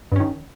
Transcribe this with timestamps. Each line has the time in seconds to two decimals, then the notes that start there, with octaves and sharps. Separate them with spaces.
0.12 G2
0.16 C#4
0.20 D#3